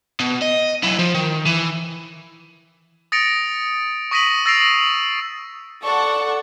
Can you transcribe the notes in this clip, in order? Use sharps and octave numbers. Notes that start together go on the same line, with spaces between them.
B2
D#5
F#3 E4
F3
D#3
E3
D#6 A6 A#6 C#7 D7 F7
C#6 D#6 A#6 B6 D#7 F#7
E6 A6 A#6 C7 D7 F7
A4 D5 F#5 C#6